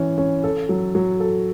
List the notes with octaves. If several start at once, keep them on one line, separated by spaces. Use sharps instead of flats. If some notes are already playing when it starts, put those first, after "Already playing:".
Already playing: E3 C#4
C#4
A4
F#3
F#3
A4